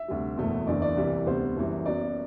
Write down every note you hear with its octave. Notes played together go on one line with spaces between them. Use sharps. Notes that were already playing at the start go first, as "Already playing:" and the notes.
Already playing: E5
D2 C3 G3
F#1 E2 B2 A3
F#1 E2 D3 D5
D5
C2 C3 E3 G3
D2 C3 G3 B3 C5
F#1 F#2 E3 G3
F#2 F#3 B3 D5